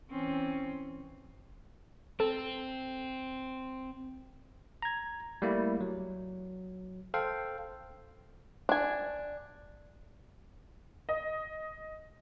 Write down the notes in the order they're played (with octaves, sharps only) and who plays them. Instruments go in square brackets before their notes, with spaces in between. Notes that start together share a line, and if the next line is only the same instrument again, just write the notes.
[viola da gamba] E3 C4 C#4
[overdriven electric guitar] C4 [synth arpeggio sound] A4
[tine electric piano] A#5 G#6
G3 A3 A#3 E4
F#3
A4 C5 F5 G5
[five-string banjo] D4 G#5
[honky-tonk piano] D#5